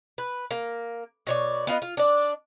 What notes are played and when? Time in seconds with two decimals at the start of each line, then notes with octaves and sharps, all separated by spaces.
0.18 B4
0.51 A#3
1.27 B2 C#5 D5
1.67 B3 F4 B4 D#5
1.82 F4
1.97 D4 D5